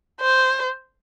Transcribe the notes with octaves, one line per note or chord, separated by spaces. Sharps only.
C5